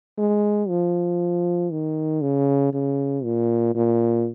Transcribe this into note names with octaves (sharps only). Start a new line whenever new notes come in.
G#3
F3
D#3
C#3
C#3
A#2
A#2